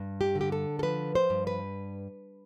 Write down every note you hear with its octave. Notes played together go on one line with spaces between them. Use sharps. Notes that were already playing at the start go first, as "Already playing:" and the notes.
Already playing: G2
G4
D3
G4
A4
A4
F3 B4
C5
G2
B4